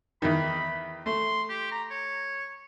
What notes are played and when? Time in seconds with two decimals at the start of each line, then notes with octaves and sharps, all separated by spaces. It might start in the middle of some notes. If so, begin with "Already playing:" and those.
0.22 E2 D#3 B5
1.06 A3 C6
1.49 G4
1.71 A#5
1.90 C#5